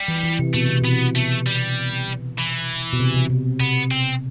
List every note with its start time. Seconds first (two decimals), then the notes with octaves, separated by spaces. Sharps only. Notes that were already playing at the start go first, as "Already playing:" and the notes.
Already playing: G3
0.08 E3
0.24 E3
0.39 C3
0.54 B2 A3
0.68 C3
0.82 B2 B3
1.16 A3
1.46 G3
2.39 E3
2.93 B2
2.99 C3
3.14 C3
3.30 C3
3.60 C3 B3
3.91 C4